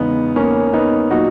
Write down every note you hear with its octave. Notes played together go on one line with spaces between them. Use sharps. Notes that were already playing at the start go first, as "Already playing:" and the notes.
Already playing: E2 C#3 G#3 B3 D#4
A#3 C#4
B3 D#4
A#2 F#3 D#4 F#4